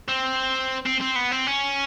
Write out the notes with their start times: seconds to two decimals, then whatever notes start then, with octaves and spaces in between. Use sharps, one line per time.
0.08 C4
0.86 C4
1.01 C4
1.16 B3
1.31 C4
1.47 C#4